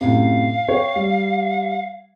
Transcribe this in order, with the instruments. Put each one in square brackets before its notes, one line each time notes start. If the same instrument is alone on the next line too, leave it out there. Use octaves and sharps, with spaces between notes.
[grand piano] F#2 A2 C3 [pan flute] F5
[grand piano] C#5 G5
G3